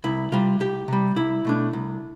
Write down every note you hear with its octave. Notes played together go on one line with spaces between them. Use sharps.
C2 E4
C3 G3 F4
C2 G4
C3 G3
C2 E4
B2 A3 D4
C2